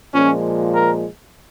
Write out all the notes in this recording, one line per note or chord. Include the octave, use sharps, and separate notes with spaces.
A#2 F3 G#3 C#4
A#4